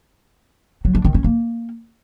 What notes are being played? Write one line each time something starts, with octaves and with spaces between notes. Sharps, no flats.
F#3
D4
D#3
C#4
A#3